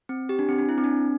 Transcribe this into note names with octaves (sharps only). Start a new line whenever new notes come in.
C4
G4
D4
C4
D4
E4
C4
D4